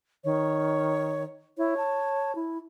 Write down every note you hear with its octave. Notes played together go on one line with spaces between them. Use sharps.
D#3 C#5
E4 C#5
A5
E4